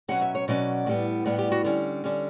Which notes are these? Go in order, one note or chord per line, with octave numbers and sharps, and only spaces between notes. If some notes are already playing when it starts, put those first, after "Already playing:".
B2 F#3 C#4 F#5
E5
C#5
B2 F#3 C#4 D5
A2 G3 B3
A2 G3 B3 F#5
G4
F#4
D3 G3 C#4
D3 G3 C#4